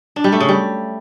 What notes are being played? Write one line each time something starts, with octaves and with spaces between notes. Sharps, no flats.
D4
G3
A3
C#3
G3